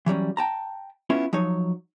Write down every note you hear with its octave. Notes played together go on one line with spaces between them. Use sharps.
E3 F#3 G3 C#4
G5 A5 A#5
B3 C#4 E4 F4
F3 F#3 D#4 C#5